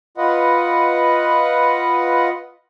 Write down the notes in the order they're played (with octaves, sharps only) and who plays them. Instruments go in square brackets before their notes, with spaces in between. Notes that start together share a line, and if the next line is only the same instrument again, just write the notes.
[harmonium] F4 B4 D#5 F#5